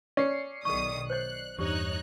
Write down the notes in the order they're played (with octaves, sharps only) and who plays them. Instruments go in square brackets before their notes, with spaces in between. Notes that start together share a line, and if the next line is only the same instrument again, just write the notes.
[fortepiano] C#4 [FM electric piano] D5 C7 C#7
[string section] B1 D#3 D#6 [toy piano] G#4 C#6
[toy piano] C5 C#5 D#5 [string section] F#6
[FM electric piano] E2 G2 G3 [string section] D#4 C#5 F#6 [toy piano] G4